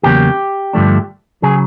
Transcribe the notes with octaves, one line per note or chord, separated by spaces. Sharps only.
E2 C#3 F#3 A#3 G4
G2 D3 F3 A3 D4
C#3 F#3 G#4